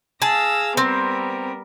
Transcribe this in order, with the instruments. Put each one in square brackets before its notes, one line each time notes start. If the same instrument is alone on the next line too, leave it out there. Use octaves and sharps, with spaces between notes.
[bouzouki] G#4 A5 [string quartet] F5 E6 A#6
[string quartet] G3 B3 A#4 [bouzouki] C4